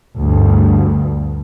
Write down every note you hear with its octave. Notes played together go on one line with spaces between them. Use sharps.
D2 G2